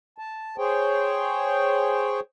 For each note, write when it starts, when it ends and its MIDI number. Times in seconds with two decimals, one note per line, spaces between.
0.18 0.56 81
0.58 2.20 68
0.58 2.20 72
0.58 2.20 73
0.58 2.20 79